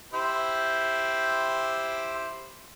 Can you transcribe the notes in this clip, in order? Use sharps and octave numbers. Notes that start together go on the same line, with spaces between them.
E4 G4 C5